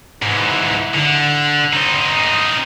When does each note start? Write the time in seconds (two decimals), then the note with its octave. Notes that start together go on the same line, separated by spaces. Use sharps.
0.22 G#2 E3
0.94 D3
1.73 C4 D#4